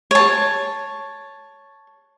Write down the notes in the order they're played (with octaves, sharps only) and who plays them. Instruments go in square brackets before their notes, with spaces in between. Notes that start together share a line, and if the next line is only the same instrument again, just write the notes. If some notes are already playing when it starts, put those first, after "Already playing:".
[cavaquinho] C#5 A5